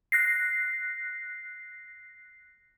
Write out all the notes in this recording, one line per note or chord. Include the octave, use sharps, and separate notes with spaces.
F#6 A#6 C7